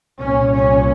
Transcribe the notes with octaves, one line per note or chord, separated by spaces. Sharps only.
C2 A#2 C#4
C#4